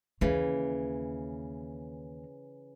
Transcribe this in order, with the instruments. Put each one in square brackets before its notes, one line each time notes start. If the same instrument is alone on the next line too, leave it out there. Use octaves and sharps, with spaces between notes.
[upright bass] D#2 A#3 [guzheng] C#3 E3